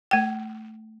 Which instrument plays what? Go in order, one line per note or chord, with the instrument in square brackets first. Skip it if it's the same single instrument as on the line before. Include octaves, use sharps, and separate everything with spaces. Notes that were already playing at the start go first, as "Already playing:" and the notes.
[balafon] A3 G5